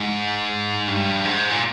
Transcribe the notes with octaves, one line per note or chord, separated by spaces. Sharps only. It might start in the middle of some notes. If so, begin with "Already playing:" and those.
Already playing: G#2
G2
G#2
A#2